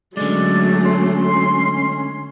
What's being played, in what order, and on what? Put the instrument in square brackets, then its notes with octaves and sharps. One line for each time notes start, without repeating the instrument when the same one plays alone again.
[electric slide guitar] D3 G#3 [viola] F#3 A3 [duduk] C#4 [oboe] D5
[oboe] C6